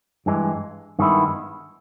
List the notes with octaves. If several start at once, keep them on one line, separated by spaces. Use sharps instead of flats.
G2 E3 G#3
G2 D#3 G#3 B3 E4